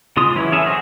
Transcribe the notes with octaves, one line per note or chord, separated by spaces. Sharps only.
C#3 G#3 F4 C6 D#6
E3 F#3 C#4 E4
C#4 G#4 A4 E5
D#4 F#4 G#4 C5